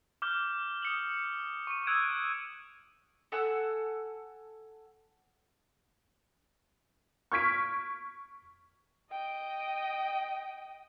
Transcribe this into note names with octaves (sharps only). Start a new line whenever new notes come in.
D6 F6 G6 G7
D#6 C#7 F#7
C#6 D#7
D#6 E6 F#6 G#6 D7 E7
A4 F#5 G#5 E6
C#6 F6 G#6 B6 D7
D#5 G5